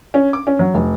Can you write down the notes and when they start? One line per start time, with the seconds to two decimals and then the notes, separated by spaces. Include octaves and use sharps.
0.14 C#4
0.33 D6
0.47 C#4
0.59 F#3
0.74 F1